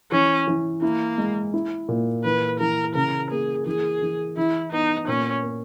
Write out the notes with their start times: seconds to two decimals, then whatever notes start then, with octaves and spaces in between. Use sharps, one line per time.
0.11 E3 C#4
0.47 E3
0.82 A#3 E4
1.18 G#3
1.53 E4
1.89 A#2
2.24 E3 B4
2.60 E3 A#4
2.95 C#3 A#4
3.31 A#3 G#4
3.66 E3 G#4
4.02 E3
4.36 E3 E4
4.72 B3 D#4
5.08 A#2 C#4
5.43 A#3